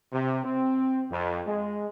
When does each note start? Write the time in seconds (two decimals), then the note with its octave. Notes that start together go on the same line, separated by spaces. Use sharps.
0.13 C3
0.45 C4
1.10 F2
1.47 G#3